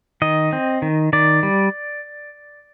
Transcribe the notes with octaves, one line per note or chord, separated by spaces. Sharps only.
D#3 D#5
C4
D#3
D#3 D5
G3